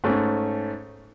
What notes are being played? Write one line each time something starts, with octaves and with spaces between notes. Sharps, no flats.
G#2 A3 C#4